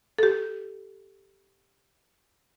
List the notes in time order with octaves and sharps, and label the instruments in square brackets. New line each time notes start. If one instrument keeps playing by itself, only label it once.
[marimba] G4 A4